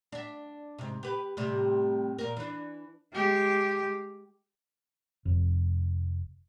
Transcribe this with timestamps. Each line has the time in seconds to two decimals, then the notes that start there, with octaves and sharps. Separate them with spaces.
0.12 D4 E5
0.79 G#2 C3
1.03 G4 B4
1.37 A2 C3 G3
2.18 A#2 A#3 A#4
2.37 E3 D4
3.13 G#3 G4
5.25 F1